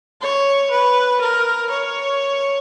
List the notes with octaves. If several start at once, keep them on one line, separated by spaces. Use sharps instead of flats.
C#5
B4
A#4
C#5